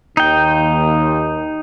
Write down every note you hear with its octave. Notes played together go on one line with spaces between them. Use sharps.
D#2 D#4 G5